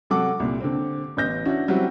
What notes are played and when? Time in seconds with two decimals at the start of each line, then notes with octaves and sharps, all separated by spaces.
0.10 C3 F#3 A4 F#5 D6
0.40 C2 A#2
0.61 D3 C4
1.17 A1 B3 G6 A#6
1.45 C#4 D4 E4 F#4
1.68 F#3 G3 C4 E4 F#4 G4